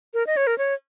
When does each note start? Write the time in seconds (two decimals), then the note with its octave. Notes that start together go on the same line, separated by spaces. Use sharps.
0.14 A#4
0.27 D#5
0.37 C#5
0.47 A#4
0.58 C#5